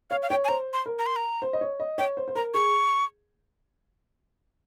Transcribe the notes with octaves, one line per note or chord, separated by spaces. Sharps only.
C#5 F5
F5
C#5 G5
G#5
C5 A#5
C6
A#4
A#5
C6
A#5
C5
D#5
C#5
D#5
C#5 G5
C5
C5
A#4 A#5
G#4 C#6